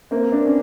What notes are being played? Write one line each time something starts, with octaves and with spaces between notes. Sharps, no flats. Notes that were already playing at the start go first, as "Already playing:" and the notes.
A#3 C4
C4 D4
C#4